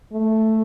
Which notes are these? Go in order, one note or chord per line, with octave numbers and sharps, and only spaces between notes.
A3